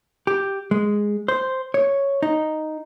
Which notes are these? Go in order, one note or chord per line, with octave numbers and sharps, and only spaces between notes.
G4
G#3
C5
C#5
D#4